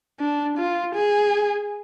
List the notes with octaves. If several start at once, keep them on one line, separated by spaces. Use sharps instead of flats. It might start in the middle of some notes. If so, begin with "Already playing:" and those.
D4
F4
G#4